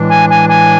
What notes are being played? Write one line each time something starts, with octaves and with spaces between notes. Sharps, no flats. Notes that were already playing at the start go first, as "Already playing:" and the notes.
Already playing: A2 E3 G#3 D4
G#5
G#5
G#5